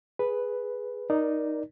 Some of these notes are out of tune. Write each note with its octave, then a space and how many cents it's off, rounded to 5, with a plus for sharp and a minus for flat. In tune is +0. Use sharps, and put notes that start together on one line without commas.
G#4 +0 B4 +0
D#4 -5 A#4 +20 D5 +0